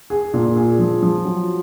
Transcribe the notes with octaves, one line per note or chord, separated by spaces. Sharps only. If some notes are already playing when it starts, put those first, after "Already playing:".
G#4
A#2
G#4
F3
F3
F#3